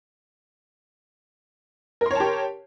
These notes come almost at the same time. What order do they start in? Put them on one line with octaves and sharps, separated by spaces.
A#4 C6 C#5 A5 G4